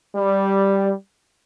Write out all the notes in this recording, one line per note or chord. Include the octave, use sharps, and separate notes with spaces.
G3